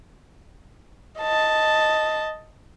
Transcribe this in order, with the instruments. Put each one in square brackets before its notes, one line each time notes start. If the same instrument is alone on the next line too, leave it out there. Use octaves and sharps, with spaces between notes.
[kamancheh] D#5 A5